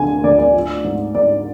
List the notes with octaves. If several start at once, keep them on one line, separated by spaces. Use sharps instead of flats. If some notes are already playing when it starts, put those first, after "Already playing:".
Already playing: D2 D3 G#5
D2 D5
D5
F3
G#2
G#2 D5